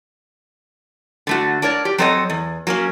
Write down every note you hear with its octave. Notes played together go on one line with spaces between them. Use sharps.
D3 A3 F#4
D4 A#4 C#5 D5
G4
F#3 C4 A4 C#5 D#5
E2
F#3 A#3 C#4